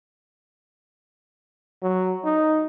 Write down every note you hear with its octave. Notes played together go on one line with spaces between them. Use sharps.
F#3
D#4